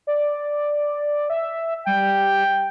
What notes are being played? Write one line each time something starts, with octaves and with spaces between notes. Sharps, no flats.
D5
E5
G3 G5